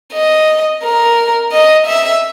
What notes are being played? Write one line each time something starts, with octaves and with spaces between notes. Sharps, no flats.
D#5
A#4
D#5
E5